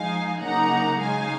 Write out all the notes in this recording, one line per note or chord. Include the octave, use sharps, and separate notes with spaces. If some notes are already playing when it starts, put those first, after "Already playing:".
Already playing: F3 G#3 D#4 F5 G#5
C#3 F#3 A#3 D#4 F#5 A#5
C#3 G#3 D#4 F5 G#5